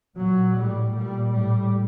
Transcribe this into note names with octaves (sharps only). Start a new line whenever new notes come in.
A#2 F#3
A2 G3
A#2 G3
A2 G3